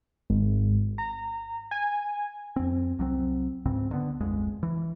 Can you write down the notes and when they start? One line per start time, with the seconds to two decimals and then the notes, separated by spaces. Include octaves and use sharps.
0.30 G#1
0.98 A#5
1.71 G#5
2.56 F2 C4
2.99 C2 F#3 G#3 C4
3.66 C#2 G#2 C#3 C4
3.91 D3 B3
4.21 D1 A#1 F2 G#3
4.63 E3